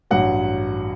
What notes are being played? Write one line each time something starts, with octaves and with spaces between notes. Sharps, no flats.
A1 G2 F#3 F#5